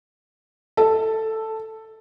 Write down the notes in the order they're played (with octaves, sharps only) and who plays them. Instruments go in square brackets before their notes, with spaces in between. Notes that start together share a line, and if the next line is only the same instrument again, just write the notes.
[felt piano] A4